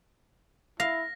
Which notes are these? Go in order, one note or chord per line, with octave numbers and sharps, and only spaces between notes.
E4 F5 A#6